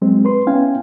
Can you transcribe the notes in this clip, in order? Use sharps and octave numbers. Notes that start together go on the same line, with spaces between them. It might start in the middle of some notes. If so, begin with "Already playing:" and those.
F#3 G#3 C4
B4 C6
B3 C#4 E4 F5 G5 G#5